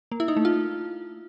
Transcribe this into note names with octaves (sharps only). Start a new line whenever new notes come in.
A#3
E4
D#4
A3
F4